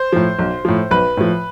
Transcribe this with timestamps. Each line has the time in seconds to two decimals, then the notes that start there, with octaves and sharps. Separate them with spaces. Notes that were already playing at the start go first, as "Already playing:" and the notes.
Already playing: C5
0.13 A2 F3
0.39 B1
0.65 A2 F3
0.91 B1 B4
1.17 A2 F3